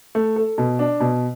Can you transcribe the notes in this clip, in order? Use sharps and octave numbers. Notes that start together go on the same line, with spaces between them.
A3
A4
B2
D4
B2